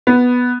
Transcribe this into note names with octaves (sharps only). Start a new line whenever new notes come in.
B3